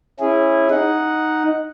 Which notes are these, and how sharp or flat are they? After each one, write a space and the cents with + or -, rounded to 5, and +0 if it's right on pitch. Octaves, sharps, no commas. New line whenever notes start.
C#4 -20 E4 +0 G#4 -15
D#4 +0 F#5 +0